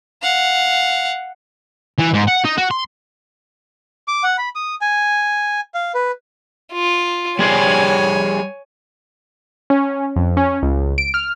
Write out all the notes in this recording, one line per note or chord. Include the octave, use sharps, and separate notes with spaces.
F5 F#5
E3
G#2
F#5
D#4
F#4
C6
D6
F#5
B5
D#6
G#5
F5
B4
F4
G3 G#4 C5 C#5 G#5
C#4
F2
C#4
C#2
D7
F6